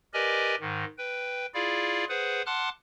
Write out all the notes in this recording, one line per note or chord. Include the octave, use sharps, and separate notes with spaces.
G4 A#4 B4 D5 D#5 G#5
G#2 D#3
B4 G5
E4 F4 G#4 D5 F5
G#4 B4 C5 F#5
F#5 A5 C6 D6 F6 F#6